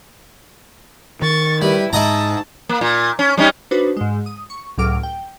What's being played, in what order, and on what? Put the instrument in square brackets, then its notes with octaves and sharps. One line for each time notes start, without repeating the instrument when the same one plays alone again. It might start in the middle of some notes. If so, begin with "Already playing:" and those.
[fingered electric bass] D#3 [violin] C#6 A6
[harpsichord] G3 [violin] E4 B4
[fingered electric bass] G#2 [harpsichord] E4 D#5 A#5 [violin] A5
[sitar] A#3
A#2
C#4
G3 C#4 D#4
[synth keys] D4 D#4 F#4 B4 C5
G#2 G#3
D#6
C#6
C#2 A2 F#3 D6 F6 D7
G5